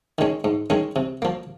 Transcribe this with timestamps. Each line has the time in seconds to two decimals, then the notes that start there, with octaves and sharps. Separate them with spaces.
0.18 D#3 G#3 C#4
0.44 G#2
0.70 D#3 G#3 C#4
0.96 C3
1.22 F3 A#3